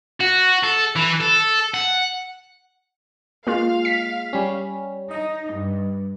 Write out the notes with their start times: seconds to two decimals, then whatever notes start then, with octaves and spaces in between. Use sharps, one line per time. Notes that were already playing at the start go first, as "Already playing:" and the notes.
0.21 F#4
0.64 A4
0.96 E3
1.20 A4
1.74 F#5
3.47 G#3 A#3 F4 F5
3.85 B6
4.33 G3 C#4
5.11 D#4 D#5
5.52 G2